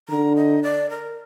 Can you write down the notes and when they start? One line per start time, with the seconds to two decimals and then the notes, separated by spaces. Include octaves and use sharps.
0.09 D3 A#5
0.36 D#5
0.63 D5
0.90 A#4